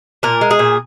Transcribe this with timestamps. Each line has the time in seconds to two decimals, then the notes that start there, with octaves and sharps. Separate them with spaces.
0.23 A#2 A#4
0.41 G#3
0.51 G#4
0.59 A#2